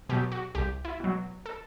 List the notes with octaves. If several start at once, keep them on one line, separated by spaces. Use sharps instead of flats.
B2 F#3 G4
F#4
C2 G4
E4
B2 F#3
A4